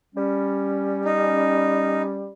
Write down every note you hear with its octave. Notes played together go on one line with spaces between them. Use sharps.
G3 C#4
D#4